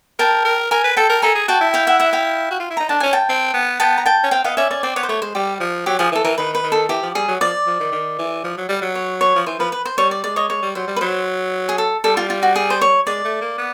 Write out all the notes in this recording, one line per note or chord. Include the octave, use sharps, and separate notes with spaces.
A#4 G5 A5
A#4
A#4 G#5 A#5
B4
A4 G5 A5
A#4
A4 G#5 A#5
G#4
F#4 G5 A5
E4
F5 G5
E5 F#5
E5 F#5
F5 G5
F#4
F4
E4
D#4 A#5
D4 A5
C#4 G#5
G5 A5
C4
B3
B3 G5 A5
A#5
G5 A5
C#4
C4 F5 G5
B3 D#5 F5
C#4 D5 E5
C#4 D5
C4 D5
B3 C#5
C5
A3 C#5
G#3 C5
G3 G4
F3
F#3 G4
F3 G#4
E3
A4
E3 A#4
D#3 B4
B4
D#3
A4
E3 G4
F3
G3 G#4
F#3
F3 D5
F3
D#3
D#3
E3
F3
F#3
G3
F#3
C#5
C#5
F3
E3 C5
F3 B4
B4
C5
G3 C#5
D5
G#3 D5
C#5 D#5
G#3 C#5
G3
F#3 C5
G3
B4
F#3 C5
G#4
A4
G3 A4
F4
F4
F#4
G#4
C5
C#5
G#3 D5
A3
A#3
B3